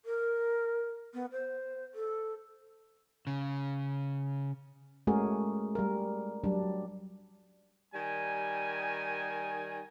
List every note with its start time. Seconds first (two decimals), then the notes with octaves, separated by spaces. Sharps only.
0.05 A#4
1.14 B3
1.32 C5
1.94 A4
3.27 C#3
5.07 G#3 A3 C#4 F#4 G#4 A#4
5.75 G3 A#4
6.44 F#3 G3 D4
7.94 D#3 G3 G#5